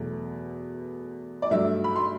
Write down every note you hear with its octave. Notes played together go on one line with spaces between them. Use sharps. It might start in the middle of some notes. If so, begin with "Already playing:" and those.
Already playing: E2 B2 F#3 A3
D5
G2 F#3 A3 E5
B5
C6